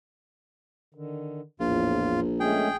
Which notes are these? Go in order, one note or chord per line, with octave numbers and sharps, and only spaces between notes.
D3 D#3
A#1 E2 A2 F4
G#3 A3 C#4 G#4 G5